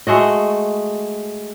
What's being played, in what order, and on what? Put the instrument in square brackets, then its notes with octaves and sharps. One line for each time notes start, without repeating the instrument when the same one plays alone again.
[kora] G#3 A3 F#4 D#5